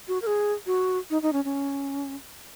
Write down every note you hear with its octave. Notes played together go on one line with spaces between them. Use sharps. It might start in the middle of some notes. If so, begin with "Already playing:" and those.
F#4
A#4
G#4
F#4
D#4
D#4
C#4
C#4